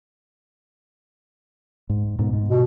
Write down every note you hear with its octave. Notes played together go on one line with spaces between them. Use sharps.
G#2
G#2 B2
G#2
B2